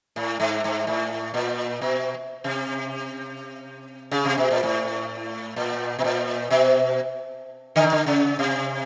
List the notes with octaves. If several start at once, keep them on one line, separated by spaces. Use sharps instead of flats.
A2
G#2
G#2
A2
A#2
B2
C3
C#3
C3
B2
A#2
A2
A#2
B2
A#2
B2
D3
D#3
D3
C#3
C3